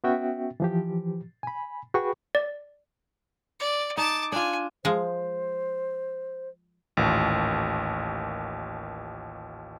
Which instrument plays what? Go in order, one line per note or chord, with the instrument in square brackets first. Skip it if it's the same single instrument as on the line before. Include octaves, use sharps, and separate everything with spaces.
[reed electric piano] B3 C#4 F#4 E5 G5
E3 F3 G4
G#5 B5
F#4 G#4 B4 G5 B5 C#6
[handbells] D5
[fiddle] D5
[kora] D#4 [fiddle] A5 D6
[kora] D4 F4 [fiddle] G#5
[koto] F3 G#3 [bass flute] C5
[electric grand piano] A1 D#2 A#2